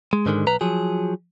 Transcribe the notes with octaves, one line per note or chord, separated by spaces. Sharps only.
G#3
G#2 D3 D#3 F3 G#3
B1 B4 A#5
F3 F#3 G#4